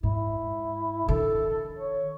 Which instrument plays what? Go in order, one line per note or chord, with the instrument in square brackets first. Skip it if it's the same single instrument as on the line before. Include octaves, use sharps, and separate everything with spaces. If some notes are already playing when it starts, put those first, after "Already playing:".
[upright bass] G#2 [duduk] E4
[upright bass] D#3 D4 [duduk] A4
[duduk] C#5